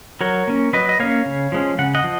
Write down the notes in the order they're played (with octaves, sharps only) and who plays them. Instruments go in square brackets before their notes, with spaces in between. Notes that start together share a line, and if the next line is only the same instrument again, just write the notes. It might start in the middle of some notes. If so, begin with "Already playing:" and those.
[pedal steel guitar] F#3 A#4 C#5
A#3 C#4
F#3 B4 D#5
D#5
A#3 C#4 C#5 F5
C#3
F3 G#3 C#4
C#3 F#5
D#5 F#5
F3